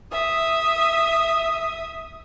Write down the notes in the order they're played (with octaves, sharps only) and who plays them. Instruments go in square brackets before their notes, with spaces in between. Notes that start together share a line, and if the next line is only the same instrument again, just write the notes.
[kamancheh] E5 D#6